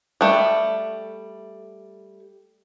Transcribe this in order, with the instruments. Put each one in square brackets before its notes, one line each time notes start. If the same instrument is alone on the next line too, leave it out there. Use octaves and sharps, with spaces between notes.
[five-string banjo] G3 A3